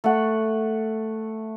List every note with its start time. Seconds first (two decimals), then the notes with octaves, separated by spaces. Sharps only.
0.04 A3 F#5